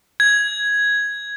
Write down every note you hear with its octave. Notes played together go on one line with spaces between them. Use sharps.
G#6